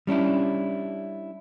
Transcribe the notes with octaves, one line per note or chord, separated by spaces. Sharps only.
G3 C#4 D4 E4